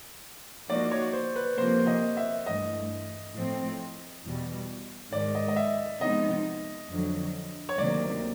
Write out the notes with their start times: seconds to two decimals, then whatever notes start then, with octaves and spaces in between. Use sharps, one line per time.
0.69 F3 A#3 D#4 F#4 D5
0.91 C#5
1.13 C5
1.36 B4
1.58 C3 F3 A#3 C5
1.87 D#5
2.17 E5
2.46 G2 E3 A3 D#5
3.35 A2 F3 A3 C4
4.23 E2 B2 G3
5.12 G#2 D#3 G#3 D5
5.35 D#5
5.48 D#5
5.56 E5
6.01 C3 F3 G#3 B3 D#4 D#5
6.90 F2 D3 F#3
7.69 C#5
7.78 D2 C3 D#3 F#3 A#3 D5